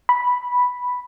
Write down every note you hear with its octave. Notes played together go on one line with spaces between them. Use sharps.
B5